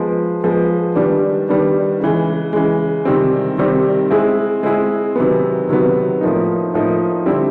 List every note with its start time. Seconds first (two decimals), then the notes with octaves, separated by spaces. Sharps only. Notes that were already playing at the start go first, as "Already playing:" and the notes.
Already playing: F3 G#3 B3
0.44 F3 G#3 B3
0.96 D#3 G3 B3 D4
1.49 D#3 G3 B3 D4
2.00 C#3 E3 G#3
2.53 C#3 E3 G#3
3.05 C3 D#3 G3 C4
3.58 C3 D#3 G3 C4
4.11 G#3 C4 E4 G#4
4.63 G#3 C4 E4 G#4
5.16 C3 D#3 F#3 B3
5.69 C3 D#3 F#3 B3
6.21 A2 F3 A#3 D#4
6.74 A2 F3 A#3 D#4
7.26 D3 G3 C4 E4